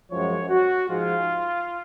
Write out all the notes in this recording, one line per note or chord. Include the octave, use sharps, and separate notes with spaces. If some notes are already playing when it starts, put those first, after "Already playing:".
F#2 F3 G#3 C#5
F#4
G#2 F3 G#3 F4